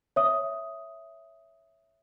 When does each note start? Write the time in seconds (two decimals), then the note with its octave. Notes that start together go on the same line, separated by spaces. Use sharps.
0.16 C#5 E5 D#6